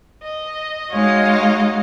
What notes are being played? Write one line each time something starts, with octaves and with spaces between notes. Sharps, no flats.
D#5
G#3 D#4 F#4 C#5 D#5 F5